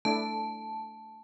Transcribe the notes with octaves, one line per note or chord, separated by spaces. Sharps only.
A3 D4 E4 A5